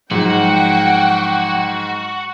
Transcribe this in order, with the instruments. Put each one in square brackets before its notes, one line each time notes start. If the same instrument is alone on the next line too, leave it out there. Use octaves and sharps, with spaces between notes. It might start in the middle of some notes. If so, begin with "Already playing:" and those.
[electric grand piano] G#2 [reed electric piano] F3 F#3 [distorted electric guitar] F#4 [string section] F#5 G5